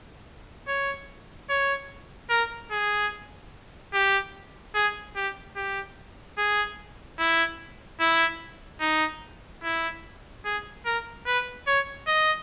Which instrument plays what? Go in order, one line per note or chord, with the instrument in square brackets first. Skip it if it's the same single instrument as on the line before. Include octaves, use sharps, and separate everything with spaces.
[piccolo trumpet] C#5
C#5
A#4
G#4
G4
G#4
G4
G4
G#4
E4
E4
D#4
E4
G#4
A#4
B4
C#5
D#5